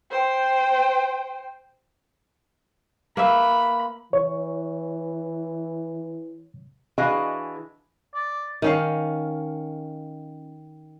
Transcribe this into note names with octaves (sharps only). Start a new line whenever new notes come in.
C5 G5
A#3 B4 E5 B5
E3 C#5
E3 D4 F#4 G#4 D#5 F5
D5
D#3 C#4 F5